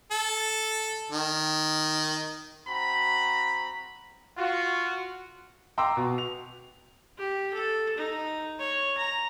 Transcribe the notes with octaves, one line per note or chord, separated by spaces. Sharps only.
A4
D#3
C4 F#4 A#5 B5
F4 F#4
G5 A#5 C6 D6 E6
B2
F7
G4
A4
D#4
C#5
A#5